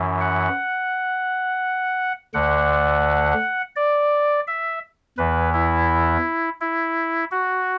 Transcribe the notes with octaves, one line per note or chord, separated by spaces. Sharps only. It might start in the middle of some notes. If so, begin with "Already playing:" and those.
Already playing: F#2 E3
F#5
D2 D3 F#5
D5
E5
E2 E3 B4
E4
E4
F#4